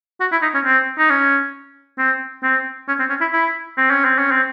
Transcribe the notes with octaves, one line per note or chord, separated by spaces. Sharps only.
F#4
E4
D#4
C#4
C4
D#4
C#4
C4
C4
C#4
C4
C#4
E4
E4
C4
C#4
C4
C#4
C4